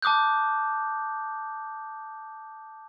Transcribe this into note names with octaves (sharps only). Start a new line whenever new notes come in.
A5 D6 D#6 F#6 G6